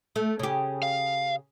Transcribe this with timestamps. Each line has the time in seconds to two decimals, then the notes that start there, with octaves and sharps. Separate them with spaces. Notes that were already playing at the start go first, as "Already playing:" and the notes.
0.16 A3
0.39 C#3 G4
0.83 F5